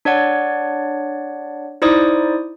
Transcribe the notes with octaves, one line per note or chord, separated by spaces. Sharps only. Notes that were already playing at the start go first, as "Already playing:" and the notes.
D4 C#5 D5 F#5
D#4 E4 C5 D5 D#6